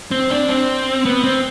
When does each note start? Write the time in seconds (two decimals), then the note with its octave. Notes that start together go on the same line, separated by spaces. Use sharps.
0.11 C4
0.30 D4
0.48 C4
1.05 B3
1.24 C4